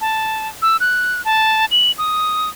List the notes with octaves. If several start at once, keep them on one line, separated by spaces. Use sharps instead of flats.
A5
E6
F#6
A5
F#7
D#6